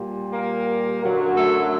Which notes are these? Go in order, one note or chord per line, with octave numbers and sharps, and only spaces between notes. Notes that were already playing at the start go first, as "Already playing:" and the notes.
Already playing: A#2 G3
A#3 A#4
F#2 D3 F#3
A3 A4